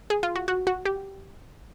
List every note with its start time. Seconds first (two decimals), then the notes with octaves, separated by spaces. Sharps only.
0.10 G#4
0.23 F4
0.36 F#4
0.48 F#4
0.67 F#4
0.85 G4